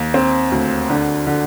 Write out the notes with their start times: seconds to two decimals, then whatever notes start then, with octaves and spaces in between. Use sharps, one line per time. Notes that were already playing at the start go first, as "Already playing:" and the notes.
Already playing: D#2
0.14 C4
0.52 D2
0.90 D3
1.27 D3